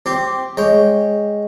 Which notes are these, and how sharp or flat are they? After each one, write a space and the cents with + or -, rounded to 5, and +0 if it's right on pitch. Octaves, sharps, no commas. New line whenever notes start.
C4 +0 G4 -10
G#3 +0 C#5 +0 G5 +0